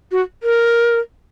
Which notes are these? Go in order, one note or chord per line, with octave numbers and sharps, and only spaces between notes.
F#4
A#4